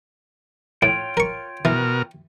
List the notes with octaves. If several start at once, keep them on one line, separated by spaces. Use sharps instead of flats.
A2 F4 C#5 G5
A#4 C#6
B2 E3 A#4